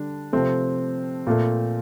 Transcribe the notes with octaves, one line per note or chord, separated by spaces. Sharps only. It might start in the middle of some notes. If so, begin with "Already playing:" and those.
Already playing: D3 G3 D4
C3 F3 A3 C4
A#2 A3